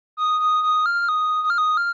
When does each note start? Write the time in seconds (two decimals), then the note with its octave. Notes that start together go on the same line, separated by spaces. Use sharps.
0.17 D#6
0.40 D#6
0.63 D#6
0.86 F6
1.09 D#6
1.44 D#6
1.50 F6
1.58 D#6
1.77 F6